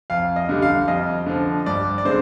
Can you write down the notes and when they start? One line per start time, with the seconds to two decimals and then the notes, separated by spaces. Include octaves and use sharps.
0.10 F2 F5
0.36 D#5
0.49 D3 G3
0.62 F5
0.88 F2 D#5
1.26 D3 F3
1.66 G2 D5
1.98 D5
2.05 D3 G#3 C4 C5